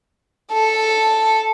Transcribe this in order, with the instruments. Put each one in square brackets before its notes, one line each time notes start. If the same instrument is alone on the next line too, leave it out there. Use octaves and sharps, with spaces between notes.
[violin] A4